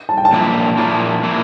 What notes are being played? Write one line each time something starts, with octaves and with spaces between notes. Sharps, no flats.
A5
G5
A5
A#2 F3 A#3 E4
A#2 F3 A#3 E4 A5
A#2 F3 A#3 E4